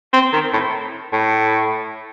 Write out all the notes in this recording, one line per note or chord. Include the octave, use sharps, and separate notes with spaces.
C4
D#3
A2
A2